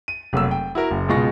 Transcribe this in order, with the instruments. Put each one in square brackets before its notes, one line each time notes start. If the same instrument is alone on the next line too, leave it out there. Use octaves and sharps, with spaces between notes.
[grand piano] D#7
F1 F#3 A#3 E6
G5
E4 F#4 A#4
F#1
C#2 B2 G#3 F4 C#6 A#6